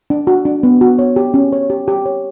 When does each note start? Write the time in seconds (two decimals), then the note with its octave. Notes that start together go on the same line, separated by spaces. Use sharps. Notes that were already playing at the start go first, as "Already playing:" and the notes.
0.10 D4
0.27 F#4
0.45 D4
0.63 B3
0.81 F#4
0.99 C#5
1.16 G4
1.34 C#4
1.52 C#5
1.70 G4
1.88 G4
2.06 C#5